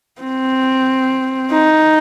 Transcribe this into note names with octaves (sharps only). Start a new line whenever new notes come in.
C4
D#4